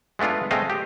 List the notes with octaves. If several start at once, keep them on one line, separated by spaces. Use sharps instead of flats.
G#3 A3 B3 D4 F4
G#3 A3 C4 D#5 F5
G4